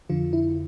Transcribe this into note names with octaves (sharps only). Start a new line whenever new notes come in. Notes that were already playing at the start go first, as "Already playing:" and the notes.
F2 D3 F3 F4
E4